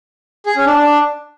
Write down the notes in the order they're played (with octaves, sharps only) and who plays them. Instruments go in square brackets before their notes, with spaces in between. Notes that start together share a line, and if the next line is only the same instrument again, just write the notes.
[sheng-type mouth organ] G#4
C#4
D4
D4